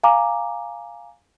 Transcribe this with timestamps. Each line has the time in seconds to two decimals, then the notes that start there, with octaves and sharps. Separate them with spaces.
0.04 F5 G#5 A#5 D6